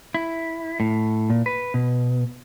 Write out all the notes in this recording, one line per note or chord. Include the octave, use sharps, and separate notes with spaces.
E4
A2
A#2
B4
B2